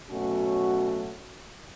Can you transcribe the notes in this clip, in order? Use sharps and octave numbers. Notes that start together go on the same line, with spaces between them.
B2 F#3 A3 C#4 F#4